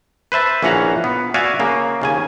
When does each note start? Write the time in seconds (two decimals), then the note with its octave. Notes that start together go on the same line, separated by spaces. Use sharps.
0.32 B4 C5 E5 A5
0.62 A#1 E3 C#4 F5 F#5 A#5
1.04 B3
1.34 F#4 D5 E5 F5 G#5
1.59 C#3 A#3
2.01 D#2 C#3 G#5